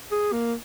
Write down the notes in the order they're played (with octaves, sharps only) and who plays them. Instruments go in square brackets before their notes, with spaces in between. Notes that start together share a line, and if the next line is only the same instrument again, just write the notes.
[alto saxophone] G#4
A#3